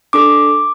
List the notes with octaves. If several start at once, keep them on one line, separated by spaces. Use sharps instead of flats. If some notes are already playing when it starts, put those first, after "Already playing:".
D4 A4 D6